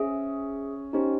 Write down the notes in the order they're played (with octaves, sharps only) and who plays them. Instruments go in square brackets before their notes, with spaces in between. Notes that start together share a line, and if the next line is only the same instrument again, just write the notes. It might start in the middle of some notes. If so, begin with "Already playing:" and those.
Already playing: [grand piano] C#4 [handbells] G#4 C5 E5
[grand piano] C#4 [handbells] D#4 G4 C5